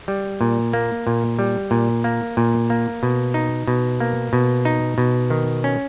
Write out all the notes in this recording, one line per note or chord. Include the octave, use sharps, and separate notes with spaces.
G3
A#2
A#3
A#2
G3
A#2
A#3
A#2
A#3
B2
D#4
B2
A#3
B2
D#4
B2
D#3
C#4